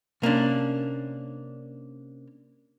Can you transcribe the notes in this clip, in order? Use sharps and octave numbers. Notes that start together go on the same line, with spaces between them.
C3 A#3 C#4 D4